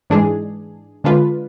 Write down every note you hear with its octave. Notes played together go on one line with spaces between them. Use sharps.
G#2 E3 G#3 D4 G#4
D3 G#3 D4 F4 B4